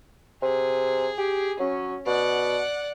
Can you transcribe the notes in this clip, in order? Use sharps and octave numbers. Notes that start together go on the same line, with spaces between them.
C3 G#4
G4
F#3 C#4
B2 D5 F#5